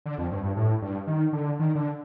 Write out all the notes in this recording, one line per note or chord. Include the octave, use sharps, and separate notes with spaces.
D3
F2
G2
G2
A2
G2
D#3
D3
D#3
D3